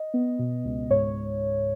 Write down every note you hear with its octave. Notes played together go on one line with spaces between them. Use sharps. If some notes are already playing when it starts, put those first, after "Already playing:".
Already playing: D#5
B3
B2
C#2
G#2 C#5